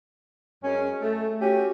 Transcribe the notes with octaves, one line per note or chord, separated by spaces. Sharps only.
F#2 G#3 C#4
A3
A3 C#4 F#4 G4